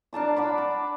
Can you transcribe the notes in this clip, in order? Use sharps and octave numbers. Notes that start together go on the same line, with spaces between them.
D4 A#4 A5 D6
D5 F#5 B5
D6